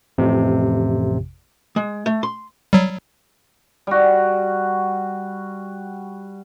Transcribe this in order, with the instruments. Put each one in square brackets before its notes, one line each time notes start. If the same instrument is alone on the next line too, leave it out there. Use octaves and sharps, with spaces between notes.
[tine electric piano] A1 F2 C3
[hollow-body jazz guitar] G#3
A3
C6
[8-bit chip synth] F#3 G3
[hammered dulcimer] G3 F#4